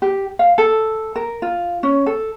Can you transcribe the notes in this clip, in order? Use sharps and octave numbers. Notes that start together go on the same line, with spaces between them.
G4
F5
A4
A#4
F4
C#4
A4